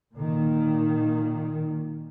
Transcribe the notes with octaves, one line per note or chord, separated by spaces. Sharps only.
A#2 D#3